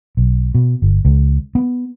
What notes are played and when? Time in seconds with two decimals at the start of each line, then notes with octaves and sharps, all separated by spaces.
0.17 B1
0.55 B2
0.82 G1
1.05 C#2
1.55 B3